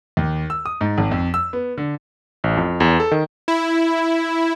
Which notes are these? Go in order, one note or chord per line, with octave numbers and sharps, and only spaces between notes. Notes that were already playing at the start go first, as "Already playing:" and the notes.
D#2
E6
D#6
G#2
G#1
F2
E6
B3
D3
A1
F2
E2
A4
D#3
E4